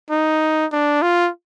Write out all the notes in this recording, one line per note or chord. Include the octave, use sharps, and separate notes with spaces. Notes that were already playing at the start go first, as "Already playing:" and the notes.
D#4
D4
F4